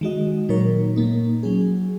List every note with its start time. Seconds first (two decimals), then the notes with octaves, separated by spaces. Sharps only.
0.01 D#3 G#3 F#4 D#5
0.49 A#2 F#3 D#4 A#4 C#5
0.96 A#2 A#3 D#4
1.43 F#3 C#4 G#4